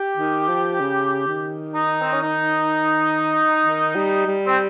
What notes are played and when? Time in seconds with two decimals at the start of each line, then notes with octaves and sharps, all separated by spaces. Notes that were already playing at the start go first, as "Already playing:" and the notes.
Already playing: G4
0.17 D#3
0.49 F3
0.80 C#3
1.27 D#3
1.75 D#4
2.01 C4
2.12 C#4
2.22 D#4
3.64 D#3
3.95 G3
4.27 G3
4.47 C4